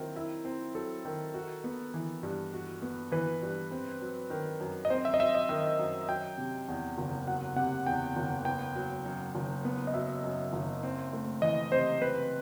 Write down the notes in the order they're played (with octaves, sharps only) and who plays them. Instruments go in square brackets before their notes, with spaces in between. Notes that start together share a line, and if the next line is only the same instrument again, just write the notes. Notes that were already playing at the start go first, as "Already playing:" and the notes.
Already playing: [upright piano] D#3 F#3 C4 E4
E4
C4
[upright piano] F#3 [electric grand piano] A4
[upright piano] D#3
F#4
B3
E3
G2
F#4
B3
[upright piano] E3 [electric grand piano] B4
[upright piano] G2
C4
F#3
D#3
F#2
[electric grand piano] D#5
[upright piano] C4 [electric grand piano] C5
[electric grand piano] E5
D#5
[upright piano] F#3 [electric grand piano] E5
[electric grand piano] D#5
[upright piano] D#3 [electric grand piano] E5
[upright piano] F#2
[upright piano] F#3 [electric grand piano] G5
[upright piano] C3
E2
F#1
[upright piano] F#3 [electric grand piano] F#5
[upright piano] C3 [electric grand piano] F#5
[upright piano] E2 [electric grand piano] G5
[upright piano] F#1
[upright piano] B3 [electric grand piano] G5
[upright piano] F#3
F#2
F#1
B3
[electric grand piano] D#5
[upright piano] F#3 [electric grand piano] E5
[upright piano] F#2
F#1
C4
A3
[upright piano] E3 [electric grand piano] D#5
[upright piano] C3 [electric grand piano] C5
[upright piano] C4 [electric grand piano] B4